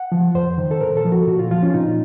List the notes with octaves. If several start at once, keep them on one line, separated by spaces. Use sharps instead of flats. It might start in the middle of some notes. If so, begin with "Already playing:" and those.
Already playing: F#5
F3
F2 C5
D#3
A4
A#2 A#4
A4
F3
F#4
A#2 F#4
F4
F3 F4
C#4
F4
A#2 D#4